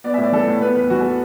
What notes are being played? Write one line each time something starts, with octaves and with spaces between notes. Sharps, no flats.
B3 D5
E5
A2
D5
E3 A4
A2
B3 B4
E2 B4
E3 F#4
A4